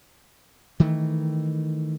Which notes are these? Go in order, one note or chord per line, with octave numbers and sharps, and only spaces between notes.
D#3 E3 A3